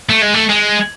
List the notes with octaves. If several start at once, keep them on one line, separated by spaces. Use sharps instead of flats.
A3
G#3
A3
G#3